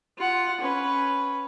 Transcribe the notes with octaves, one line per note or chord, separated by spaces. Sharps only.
F4 F#5
C#4 B4